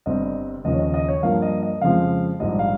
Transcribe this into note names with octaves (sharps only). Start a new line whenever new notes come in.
G1 G2 G3 C4 D#5
D#2 C#3 F3 D#5
C#5
D#5
D#5
C#5
G2 F3 A#3 F5
D#5
D#5
F2 C#3 F3 G#3 F5
A#1 G#2 G3 D#5
F5